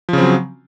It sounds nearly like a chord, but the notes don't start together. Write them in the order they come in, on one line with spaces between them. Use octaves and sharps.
F3 C#3 C4 F#3